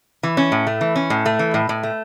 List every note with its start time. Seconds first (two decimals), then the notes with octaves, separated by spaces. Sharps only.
0.23 E3
0.37 C#4
0.52 A2
0.67 A3
0.81 E3
0.96 C#4
1.10 A2
1.26 A3
1.39 E3
1.54 A2
1.69 A2
1.83 A3